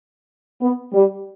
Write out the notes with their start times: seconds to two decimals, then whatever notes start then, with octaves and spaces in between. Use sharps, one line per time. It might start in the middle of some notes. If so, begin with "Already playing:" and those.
0.61 B3
0.93 G3